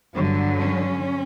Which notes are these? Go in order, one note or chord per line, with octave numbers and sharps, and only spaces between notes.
G2 D3 F#3
C#4